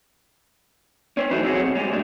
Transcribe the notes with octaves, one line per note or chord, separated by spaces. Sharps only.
C#4 C5
E3 F#3 A3 D#4 E4 F#4
C4 C#4 F#4 G#4
B1
G3 G#3
B1 A2 D4